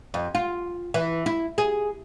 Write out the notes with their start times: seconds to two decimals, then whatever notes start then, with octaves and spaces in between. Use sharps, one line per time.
0.14 F2
0.35 F4
0.94 E3
1.26 E4
1.58 G#4